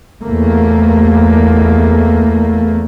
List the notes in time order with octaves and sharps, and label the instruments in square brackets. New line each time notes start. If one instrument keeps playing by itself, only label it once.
[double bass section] E2 A3 A#3